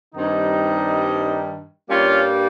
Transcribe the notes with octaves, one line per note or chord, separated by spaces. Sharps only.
G2 D#3 G3 C4 D#4
G2 G3 A#3 C#4 F4